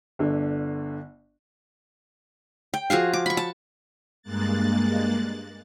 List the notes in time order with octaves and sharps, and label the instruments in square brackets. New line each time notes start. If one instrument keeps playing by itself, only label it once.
[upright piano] G1 D3
[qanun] G5
F3 F#4 G#4 F5
D6
B5 C#6
A5
[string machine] G2 G#3 A#3 F#6 A6